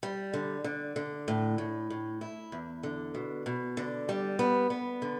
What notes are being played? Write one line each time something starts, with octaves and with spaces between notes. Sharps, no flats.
G3
D3
D3
D3
A2
A2
A2
E4
E2
D3
B2
B2
D3
G3
B3
B3
D3